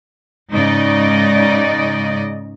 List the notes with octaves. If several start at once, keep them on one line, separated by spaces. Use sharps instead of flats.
G#2 C#3 D#4 D5 D#5